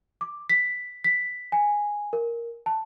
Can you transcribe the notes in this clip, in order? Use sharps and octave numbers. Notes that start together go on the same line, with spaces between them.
D6
B6
B6
G#5
A#4
A5